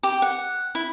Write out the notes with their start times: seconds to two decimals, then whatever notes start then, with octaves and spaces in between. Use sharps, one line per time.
0.03 G4
0.22 F#5
0.75 E4